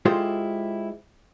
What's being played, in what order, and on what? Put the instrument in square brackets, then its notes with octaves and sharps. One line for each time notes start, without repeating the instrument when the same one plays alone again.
[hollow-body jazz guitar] G#3 E4 F4 G4 A4 C5